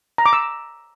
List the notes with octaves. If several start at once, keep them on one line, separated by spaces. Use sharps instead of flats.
A#5
D6
E6